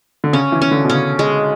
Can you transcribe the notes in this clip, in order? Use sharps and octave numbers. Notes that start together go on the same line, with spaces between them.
D3
C#3 C#4
E3
C#4
D3
B2
C#3 C#4
G#3